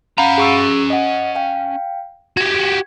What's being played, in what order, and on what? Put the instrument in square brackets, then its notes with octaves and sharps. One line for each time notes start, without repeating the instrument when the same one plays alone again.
[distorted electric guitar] C#4 A#5 [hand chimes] F5 F#5 B5
[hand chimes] G#4 C#6 E6
D#5 F#5
F5 G5
[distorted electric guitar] F#4 G4 [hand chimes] G#6